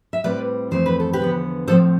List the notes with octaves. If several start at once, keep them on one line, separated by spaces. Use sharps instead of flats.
E5
A2 G3 C4 B4 D5
F2 E3 A3 C4 C5
B4
A4
G4 B4
E2 D3 F3 B3
A2 F3 C4 A4 C5